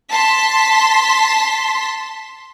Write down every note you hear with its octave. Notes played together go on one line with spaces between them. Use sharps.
A5 C6 B6